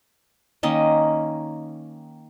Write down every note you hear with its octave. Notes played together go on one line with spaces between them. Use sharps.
D#3 A#3 C#4 D#5